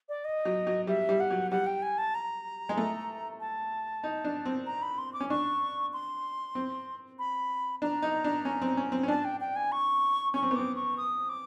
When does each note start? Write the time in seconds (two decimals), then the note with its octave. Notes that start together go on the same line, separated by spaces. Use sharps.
0.09 D5
0.25 D#5
0.45 F#3
0.67 F#3
0.87 G3 E5
1.09 G3
1.20 F#5
1.30 F#3
1.51 G3 F#5
1.67 G5
1.82 G#5
1.98 A5
2.15 A#5
2.69 G#3
2.77 A3
3.40 A5
4.04 D#4
4.25 D4
4.45 C4
4.66 A#5
4.82 B5
4.98 C6
5.14 D6
5.20 C#4
5.30 D4 C#6
5.93 C6
6.55 C4
7.19 B5
7.82 D4 A#5
8.02 D#4
8.24 D4
8.45 C#4
8.62 C4
8.77 C#4
8.92 C4
9.03 C#4
9.08 D4 A5
9.25 G5
9.40 G5
9.56 G#5
9.72 C#6
10.34 C#4 C#6
10.43 C4
10.51 B3
10.56 C4 D6
10.76 C#6
10.97 D#6
11.29 D6